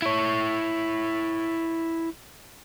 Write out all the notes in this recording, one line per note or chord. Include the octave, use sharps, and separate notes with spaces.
E4 C#5